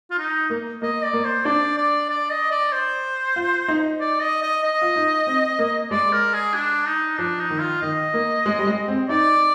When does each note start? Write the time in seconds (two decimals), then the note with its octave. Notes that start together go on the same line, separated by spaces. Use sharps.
0.11 F4
0.18 D#4
0.50 A#3
0.82 A#3 D#5
1.04 D5
1.13 A#3
1.25 C5
1.45 D4 D5
1.78 D5
2.09 D5
2.30 D#5
2.51 D5
2.73 C5
3.36 F4
3.68 D#4
4.00 D5
4.21 D#5
4.43 D#5
4.64 D#5
4.82 F4
4.96 D#4
5.27 C4
5.59 A#3
5.91 G#3 D5
6.13 A#4
6.33 G#4
6.55 D4
6.87 D#4
7.19 F3 D4
7.40 D#4
7.50 D#3
7.60 F4
7.82 D#3 D#5
8.14 A#3
8.46 G#3
8.59 G3
8.67 G#3
8.88 C4
9.09 D#4 D5